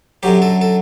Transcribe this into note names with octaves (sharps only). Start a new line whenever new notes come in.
F#2 D3 F#3 G4
A4
A4